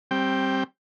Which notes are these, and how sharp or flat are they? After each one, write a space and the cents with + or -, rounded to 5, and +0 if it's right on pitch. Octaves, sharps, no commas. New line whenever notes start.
G3 +0 C4 +20 G5 +0